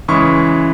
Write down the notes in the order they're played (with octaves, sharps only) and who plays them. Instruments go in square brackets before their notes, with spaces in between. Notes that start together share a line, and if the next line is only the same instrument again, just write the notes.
[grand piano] C#3 E3 G#3 C#6